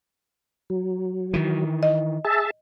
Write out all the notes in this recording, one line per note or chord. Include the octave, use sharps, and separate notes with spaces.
F#3
D#3 E3
D#5
G#4 E5 A5